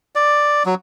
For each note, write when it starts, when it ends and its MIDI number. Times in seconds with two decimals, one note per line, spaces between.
0.15 0.63 74
0.66 0.75 54